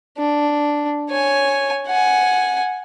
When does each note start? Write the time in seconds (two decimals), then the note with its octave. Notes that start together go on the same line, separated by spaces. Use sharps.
0.18 D4
1.10 C#5 G#5
1.87 F#5 G#5